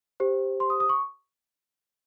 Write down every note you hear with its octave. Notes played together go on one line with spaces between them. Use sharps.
G4 C5
C6
D#6
D#6
C#6